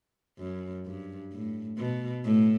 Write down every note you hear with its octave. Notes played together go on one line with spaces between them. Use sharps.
F#2
G2
A2
B2
A2